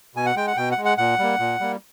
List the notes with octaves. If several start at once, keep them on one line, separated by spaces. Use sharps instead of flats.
B2 G#5
F#5
G#3 G5
F#5
B2 G5
F#5
G#3
F#5
A#2 F#5
G3 A#3
A#2
G3 A#3